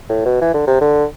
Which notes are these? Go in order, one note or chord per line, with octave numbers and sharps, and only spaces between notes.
A2
B2
E3
D3
C3
D3